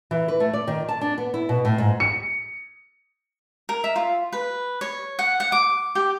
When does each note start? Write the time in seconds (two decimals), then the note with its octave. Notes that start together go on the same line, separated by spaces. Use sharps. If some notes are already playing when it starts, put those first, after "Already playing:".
0.11 E3
0.28 B4
0.40 A3
0.53 D5
0.67 D#3
0.89 A5
1.01 D4
1.18 B3
1.34 E4
1.49 B2
1.65 A2
1.78 G#2
2.00 C#7
3.69 A#4
3.84 E5
3.96 F4
4.33 B4
4.81 C#5
5.19 F#5
5.40 F#5
5.52 D6
5.95 G4